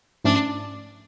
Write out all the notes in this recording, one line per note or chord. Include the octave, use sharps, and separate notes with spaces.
G#2 F3 A3 C#4 D4